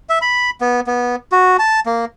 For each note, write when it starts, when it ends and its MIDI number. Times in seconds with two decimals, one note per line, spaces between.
0.09 0.19 76
0.22 0.50 83
0.61 0.80 59
0.87 1.16 59
1.32 1.57 66
1.59 1.80 81
1.86 2.05 58